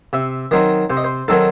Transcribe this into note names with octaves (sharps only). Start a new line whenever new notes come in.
C3 E5
D#3 F#3 C4 D#4 D#5
C3 C5
D#5
C5
D#3 F#3 C4 D#4 A4